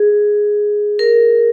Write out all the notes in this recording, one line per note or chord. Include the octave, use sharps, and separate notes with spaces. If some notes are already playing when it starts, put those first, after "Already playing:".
Already playing: G#4
A#4